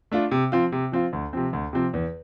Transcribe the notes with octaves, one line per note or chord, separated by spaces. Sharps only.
A3 D4 F4
C3
F3 C4 F4
C3
F3 C4 F4
D2
C3 F3 C4
D2
C3 F3 C4
E2